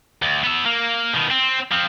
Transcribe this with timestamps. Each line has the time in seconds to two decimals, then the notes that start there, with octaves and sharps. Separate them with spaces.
0.22 D2
0.44 B3 E5
0.66 A#3
1.15 B2 D#3
1.31 C4
1.72 F3 C4